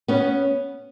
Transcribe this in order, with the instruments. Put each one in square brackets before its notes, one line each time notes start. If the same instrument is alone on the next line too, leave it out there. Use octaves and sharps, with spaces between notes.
[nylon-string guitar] B3 C#4